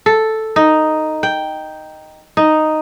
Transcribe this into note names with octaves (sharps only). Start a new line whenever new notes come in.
A4
D#4
G5
D#4